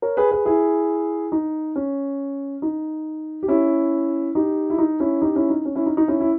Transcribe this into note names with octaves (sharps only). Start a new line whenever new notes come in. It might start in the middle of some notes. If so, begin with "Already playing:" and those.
A#4 C#5
G#4 B4
G#4 B4
E4 G#4
D#4
C#4
D#4
G4
C#4 E4
D#4 G4
E4
D#4
C#4 E4
D#4 G4
C#4 E4
D#4
C#4
C#4 E4
D#4
D#4
C#4 E4
E4